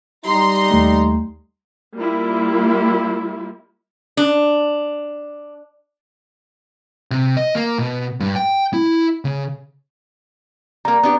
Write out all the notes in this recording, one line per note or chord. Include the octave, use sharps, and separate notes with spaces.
G3 D#4 G4 A#5 C6
D#2 A3
G3 A#3 E4 F4
D4
C3
D#5
A#3
B2
G2
G5
E4
C#3
G3 A#3 A#5
B3 D4 G4